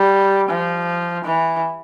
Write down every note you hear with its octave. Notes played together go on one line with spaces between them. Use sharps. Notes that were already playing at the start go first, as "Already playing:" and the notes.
Already playing: G3
F3
E3